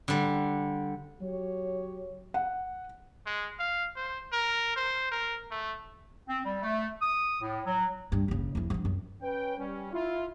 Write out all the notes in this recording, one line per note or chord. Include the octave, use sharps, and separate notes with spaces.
D3 G3
F#3 G4 C#5
F#5
G#3
F5
C5
A#4
C5
A#4
A3
C4
G3
A3
D#6
A2
F#3
G2
F#1 C#3
F2 E4
G2 F3
F#2
C#4 B4 G5
G3 C#4
E4 F4